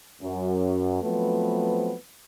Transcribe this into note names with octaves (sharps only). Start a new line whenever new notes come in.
F#2
F3 F#3 A3 B3 C4 B4